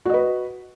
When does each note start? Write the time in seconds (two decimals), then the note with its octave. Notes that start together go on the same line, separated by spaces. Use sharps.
0.05 F#4
0.10 D#5
0.14 B4